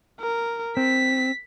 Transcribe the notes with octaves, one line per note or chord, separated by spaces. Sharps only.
A#4
C4 B6